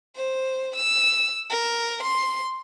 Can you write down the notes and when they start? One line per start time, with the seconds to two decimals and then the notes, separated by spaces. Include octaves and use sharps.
0.16 C5
0.76 E6
1.50 A#4
2.03 C6